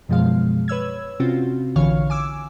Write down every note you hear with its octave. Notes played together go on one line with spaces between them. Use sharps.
F#2 B2 F3 G#3 F5
B4 C#5 E6 G#6
C3 C4 C#4 F4 F#4
A#1 D3 E3 C#5 F5 C#6
G#5 D6 E6